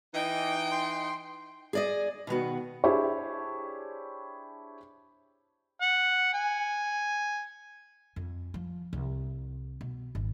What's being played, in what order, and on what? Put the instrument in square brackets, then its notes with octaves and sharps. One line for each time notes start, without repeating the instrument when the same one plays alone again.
[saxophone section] E3 D#4 [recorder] D#5 [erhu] G5
[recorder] C6
[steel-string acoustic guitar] G#4 D5 D#5
B2 D#3 B3 F#4
[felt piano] D4 E4 G4 G#4 C5 C#5
[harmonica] F#5
G#5
[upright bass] F2
F3
C2
B2
G#1